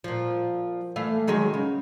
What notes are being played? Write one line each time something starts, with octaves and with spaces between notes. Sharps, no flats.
A#2 F3
E3 A3 F5
D#3 F#3 G#3
C#3